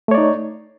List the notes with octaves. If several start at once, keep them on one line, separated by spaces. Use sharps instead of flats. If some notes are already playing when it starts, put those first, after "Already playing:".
A3 D#4 C#5 D5